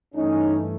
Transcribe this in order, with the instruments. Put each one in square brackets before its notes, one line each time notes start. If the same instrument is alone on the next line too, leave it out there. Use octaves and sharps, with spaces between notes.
[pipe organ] G2 E3 A3 [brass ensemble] C#4 D#4